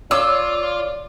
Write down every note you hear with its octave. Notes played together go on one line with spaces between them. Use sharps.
F4 C#5 D5 F5 D6 E6